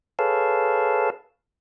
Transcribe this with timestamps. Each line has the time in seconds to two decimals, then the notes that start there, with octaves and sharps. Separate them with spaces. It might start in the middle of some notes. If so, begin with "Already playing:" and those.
0.19 G#4 A4 B4 C#5 F5 A5